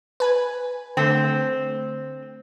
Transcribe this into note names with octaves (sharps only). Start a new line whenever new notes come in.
B4 G#5
D3 A3 C4